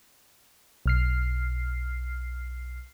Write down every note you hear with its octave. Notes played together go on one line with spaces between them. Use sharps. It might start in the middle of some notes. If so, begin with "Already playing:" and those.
B1 F6 C7